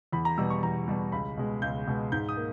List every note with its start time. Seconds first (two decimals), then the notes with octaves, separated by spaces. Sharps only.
0.12 E2 B5
0.25 A#5
0.38 B2 G3 E6
0.50 C#6
0.63 E2 A#5
0.88 B2 G3
1.12 C#2 B5
1.37 B2 G#3
1.62 C#2 G6
1.87 B2 G#3
2.12 G#2 G6
2.29 D#6
2.37 A#3